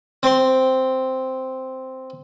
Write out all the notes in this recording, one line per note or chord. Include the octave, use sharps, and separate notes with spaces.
C4 C6